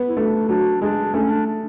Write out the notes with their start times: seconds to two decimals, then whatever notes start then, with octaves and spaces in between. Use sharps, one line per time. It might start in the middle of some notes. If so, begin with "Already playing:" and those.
Already playing: B3
0.09 E4
0.17 A3 D4
0.49 F#3 D4
0.82 G#3 D4
1.14 A3 C#4
1.30 D4
1.46 D4